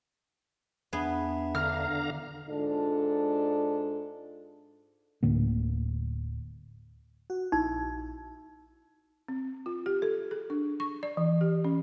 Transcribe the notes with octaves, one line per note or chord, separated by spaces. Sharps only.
E2 B3 D4 G#4 E5
D3 F5 A#5 F6
G#2 D4 F4 A4
D1 A2 D3 A#3
F#4
A#1 D#4 E4
C4
F4
G4
A4
G#4
D4
C#6
D5
E3
G4
C#4